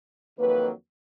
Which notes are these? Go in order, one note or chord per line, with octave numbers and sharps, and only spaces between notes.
F2 D#3 F#3 A#3 B4